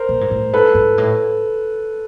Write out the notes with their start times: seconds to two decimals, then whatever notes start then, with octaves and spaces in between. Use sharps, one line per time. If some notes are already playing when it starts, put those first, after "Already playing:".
Already playing: A#4 C5
0.09 A#2
0.21 G#2
0.31 A2
0.53 G#2 A4 B4
0.75 G#2
0.98 A2